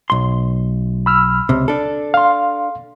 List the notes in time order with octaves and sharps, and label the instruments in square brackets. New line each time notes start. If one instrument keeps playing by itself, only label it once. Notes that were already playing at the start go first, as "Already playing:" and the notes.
[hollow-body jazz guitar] B1 C6
[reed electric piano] B5 E6 F6
[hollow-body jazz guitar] C#2 C3
D4 A4
[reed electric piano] F5 C6